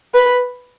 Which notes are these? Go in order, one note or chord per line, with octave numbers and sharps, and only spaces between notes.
B4